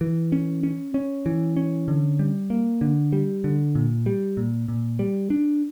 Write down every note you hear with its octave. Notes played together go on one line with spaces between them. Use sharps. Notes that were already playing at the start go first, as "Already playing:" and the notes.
E3
C#4
C#4
C#4
E3
C#4
D3
G3
A#3
D3
G3
D3
A#2
G3
A#2
A#2
G3
D4